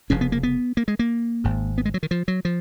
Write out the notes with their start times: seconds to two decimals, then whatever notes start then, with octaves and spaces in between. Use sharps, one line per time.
0.10 F1 F2 C#3 C#4
0.21 B3
0.32 A#3
0.43 B3
0.77 A#3
0.88 G#3
0.99 A#3
1.44 G#1 G#2
1.78 B3
1.85 G#3
1.94 F#3
2.03 D#3
2.11 F3
2.28 F#3
2.45 F3